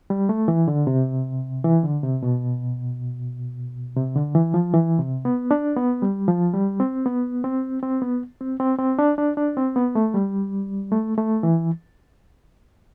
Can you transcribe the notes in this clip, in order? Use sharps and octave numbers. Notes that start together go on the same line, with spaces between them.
G3
A3
E3
D3
C3
E3
D3
C3
B2
C3
D3
E3
F3
E3
C3
B3
D4
B3
G3
F3
G3
C4
B3
C4
C4
B3
C4
C4
C4
D4
D4
D4
C4
B3
A3
G3
A3
A3
E3